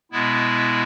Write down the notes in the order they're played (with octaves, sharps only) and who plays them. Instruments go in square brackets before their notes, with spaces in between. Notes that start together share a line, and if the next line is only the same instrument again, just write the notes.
[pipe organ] B2 G#3 B3 E4